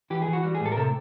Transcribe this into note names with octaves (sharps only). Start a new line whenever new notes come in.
E3 G4
G#4
E3
F#4
G3 F#4
G#4
A2 A4
A#4
C3 A4